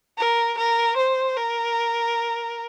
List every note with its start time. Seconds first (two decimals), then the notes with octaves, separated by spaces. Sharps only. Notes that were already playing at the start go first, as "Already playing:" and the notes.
0.18 A#4
0.58 A#4
0.97 C5
1.37 A#4